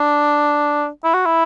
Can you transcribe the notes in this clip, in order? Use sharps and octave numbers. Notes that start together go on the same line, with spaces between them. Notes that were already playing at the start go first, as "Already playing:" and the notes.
Already playing: D4
E4
F#4
E4